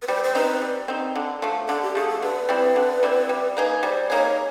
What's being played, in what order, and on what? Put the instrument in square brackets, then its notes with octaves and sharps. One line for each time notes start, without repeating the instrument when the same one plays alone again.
[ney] B4
[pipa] G3 [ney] C5
[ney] C5
[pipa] C4 D#4 [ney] B4
[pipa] G3
C4 D#4
D3
F3 A3
[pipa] D3 [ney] A4
[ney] G4
[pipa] F3 A3 [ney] G#4
[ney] A4
[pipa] D3 [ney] B4
[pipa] G3 C4 E4
D3
G3 C4 E4
G3
A#3 D#4 G#4
[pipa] G3 [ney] C5
[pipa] A#3 D#4 G#4 [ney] C#5